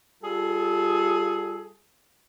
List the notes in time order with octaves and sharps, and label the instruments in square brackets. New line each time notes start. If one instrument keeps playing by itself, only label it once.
[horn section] G3 F4 G#4 A4